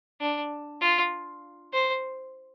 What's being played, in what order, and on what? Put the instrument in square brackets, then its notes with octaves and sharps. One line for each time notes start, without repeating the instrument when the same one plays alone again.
[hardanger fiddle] D4
F4
C5